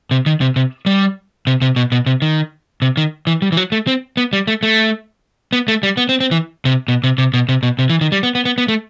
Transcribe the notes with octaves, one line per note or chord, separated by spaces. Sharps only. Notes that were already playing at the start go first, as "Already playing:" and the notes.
C3
D#3
C3
C3
G3
C3
C3
B2
B2
C3
D#3
C3
D#3
E3
G3
E3
F#3
A3
C4
B3
G3
A3
A3
B3
A3
G3
B3
C4
C4
E3
C3
B2
C3
C3
B2
C3
B2
C3
E3
D#3
G3
B3
B3
B3
B3
A3